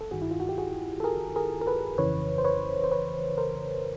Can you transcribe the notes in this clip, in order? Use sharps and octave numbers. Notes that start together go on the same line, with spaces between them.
A4
G1 G2 D#3 F#4 G#4
E4
F4
F#4
G4
F#4 G#4
A4
G#4 A#4
G#4 A#4
A#4
A4 B4
G1 F2 C#3 E3 B4 C#5
C5
B4 C#5
C5
B4 C#5
A#4 C5